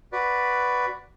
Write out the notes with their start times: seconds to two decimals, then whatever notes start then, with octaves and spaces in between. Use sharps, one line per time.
0.12 F#4 B4 D5